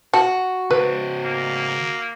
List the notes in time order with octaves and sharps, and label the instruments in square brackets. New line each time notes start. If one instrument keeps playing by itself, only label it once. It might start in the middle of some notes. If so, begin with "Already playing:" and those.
[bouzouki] F#4 [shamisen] A5
[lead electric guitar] C#3 C5 [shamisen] B4
[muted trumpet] A#3